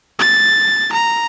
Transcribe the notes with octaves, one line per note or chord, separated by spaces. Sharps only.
A6
A#5